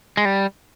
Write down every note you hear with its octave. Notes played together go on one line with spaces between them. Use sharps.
G#3
G3